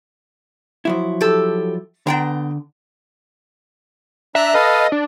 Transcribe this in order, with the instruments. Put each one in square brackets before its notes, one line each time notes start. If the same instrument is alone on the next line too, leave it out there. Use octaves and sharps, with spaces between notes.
[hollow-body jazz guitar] F3 F#3 E4
[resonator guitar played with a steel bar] G4 A4
[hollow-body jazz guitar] D3 [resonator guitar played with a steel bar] B3 G5 A#5
[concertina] D4 A#5 F#6 [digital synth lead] E5
[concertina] A4 B4 F5 [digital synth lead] D#5
[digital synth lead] D4